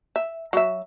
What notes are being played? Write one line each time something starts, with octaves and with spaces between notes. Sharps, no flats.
E5
F#3 E5